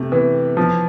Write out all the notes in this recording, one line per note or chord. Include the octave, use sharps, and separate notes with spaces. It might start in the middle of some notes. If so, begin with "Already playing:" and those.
Already playing: C3 A3
E3
F3